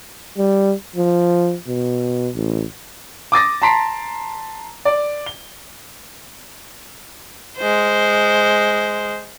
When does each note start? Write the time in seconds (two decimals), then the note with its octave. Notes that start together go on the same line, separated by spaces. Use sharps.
0.38 G3
0.96 F3
1.67 B2
2.34 A1
3.32 D6 D#6 A6 A#6
3.62 A5 A#5 C6 B6 C7 D7
4.85 D5
5.26 G7
7.58 G#3 C5